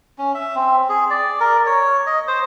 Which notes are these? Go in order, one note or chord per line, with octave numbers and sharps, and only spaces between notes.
C#4
E5
C4
G#4
D5
A#4
C#5
D#5
C5